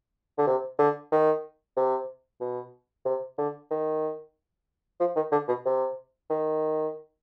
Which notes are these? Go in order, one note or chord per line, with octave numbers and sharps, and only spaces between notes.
D3
C3
D3
D#3
C3
B2
C3
D3
D#3
F3
D#3
D3
B2
C3
D#3